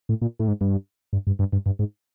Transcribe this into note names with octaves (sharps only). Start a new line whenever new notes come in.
A2
A#2
A2
G#2
G2
G2
G2
G2
G2
G2
G#2